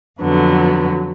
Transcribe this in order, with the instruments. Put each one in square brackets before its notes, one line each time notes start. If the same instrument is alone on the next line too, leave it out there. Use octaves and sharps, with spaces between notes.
[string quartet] F2 D3 F#3 B3